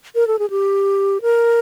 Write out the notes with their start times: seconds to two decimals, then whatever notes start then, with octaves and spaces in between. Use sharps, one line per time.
0.15 A#4
0.27 A4
0.39 G#4
0.50 G4
1.22 A#4